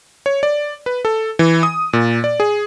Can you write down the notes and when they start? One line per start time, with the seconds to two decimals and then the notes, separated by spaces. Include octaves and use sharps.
0.26 C#5
0.43 D5
0.86 B4
1.05 A4
1.39 E3
1.63 D#6
1.93 A#2
2.24 D5
2.40 G#4